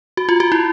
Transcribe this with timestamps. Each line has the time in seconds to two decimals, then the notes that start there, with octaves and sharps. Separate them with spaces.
0.17 F#4
0.29 F4
0.40 F#4
0.52 E4